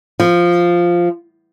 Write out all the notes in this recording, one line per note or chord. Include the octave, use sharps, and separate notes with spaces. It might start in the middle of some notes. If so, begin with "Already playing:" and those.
F3